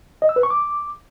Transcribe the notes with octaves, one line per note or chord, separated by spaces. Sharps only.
D#5
E6
B4
C#6
D6